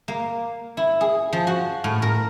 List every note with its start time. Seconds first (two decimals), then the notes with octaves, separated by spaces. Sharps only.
0.08 A#3
0.77 E4
1.01 G#4
1.33 F3
1.47 F#4
1.84 A2
2.02 A#4